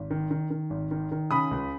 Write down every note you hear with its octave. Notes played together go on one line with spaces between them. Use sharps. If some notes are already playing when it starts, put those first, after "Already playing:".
Already playing: G#1
D#3
D#3
D#3
G#1
D#3
D#3
C#3 B5 D#6
C#2